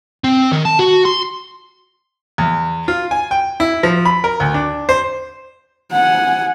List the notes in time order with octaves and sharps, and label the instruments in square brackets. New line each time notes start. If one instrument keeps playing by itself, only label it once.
[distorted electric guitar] C4
D#3
A5
F#4
C6
[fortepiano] E2
F4
G#5
G5
E4
F3
B5
A#4
D2
D4
C5
[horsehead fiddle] F#5 G#5